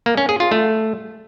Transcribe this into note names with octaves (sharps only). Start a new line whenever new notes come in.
A#3
C#4
G#4
F4
A3